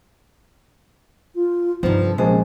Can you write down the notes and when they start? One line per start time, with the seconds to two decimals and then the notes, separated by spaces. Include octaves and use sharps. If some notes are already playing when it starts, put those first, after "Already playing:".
1.35 F4
1.83 G2 C3 F3 D#4
2.01 A4
2.18 A#1 G#3 C#4 C5 A5